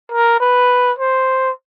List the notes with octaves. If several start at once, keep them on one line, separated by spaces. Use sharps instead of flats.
A#4
B4
C5